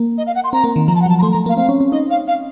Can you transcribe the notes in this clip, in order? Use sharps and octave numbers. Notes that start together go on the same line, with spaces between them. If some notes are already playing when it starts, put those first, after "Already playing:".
Already playing: A#3
D#5
F5
F#5
C6
C4 A#5
A#3
D#3
F3 A#5
A5
F#5
F#3 A5
A#5
A3 C6
A#5
A3
A#3 F5
C4 F5
C#4
C#4
D#4 D#5
F5
F5